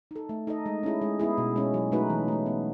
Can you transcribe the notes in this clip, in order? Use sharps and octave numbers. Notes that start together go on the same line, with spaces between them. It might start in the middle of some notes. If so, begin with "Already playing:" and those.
D#4 A4
A3
D#4 A4 D#5
G#3
C#4 E4 G#4
G#3
B3 E4 G#4
B2
G#3 C#4
F#3
A3 D#4 F#4 B4
E3
A3 E4
B3